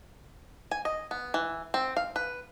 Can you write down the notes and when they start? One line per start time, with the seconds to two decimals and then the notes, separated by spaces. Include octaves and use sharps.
0.71 G#5
0.85 D#5
1.11 B3
1.34 E3
1.74 C4
1.97 F5
2.16 B4